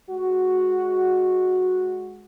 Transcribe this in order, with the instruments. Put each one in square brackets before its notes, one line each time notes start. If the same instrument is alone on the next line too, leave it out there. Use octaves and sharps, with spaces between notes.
[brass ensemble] G#3 F#4